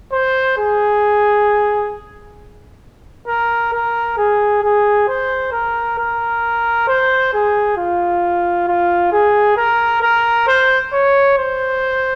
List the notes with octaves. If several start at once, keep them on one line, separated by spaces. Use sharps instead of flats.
C5
G#4
A#4
A#4
G#4
G#4
C5
A#4
A#4
C5
G#4
F4
F4
G#4
A#4
A#4
C5
C#5
C5